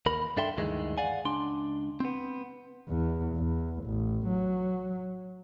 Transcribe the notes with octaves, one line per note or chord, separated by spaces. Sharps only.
D#2 A#4 B5
G2 D4 A4 E5 G5 C6
D2 G2 D#3 E3 G#3
D5 F5 F#5 G#5
C#2 D4 C6
B3 C4
E2
E2
A1
F#3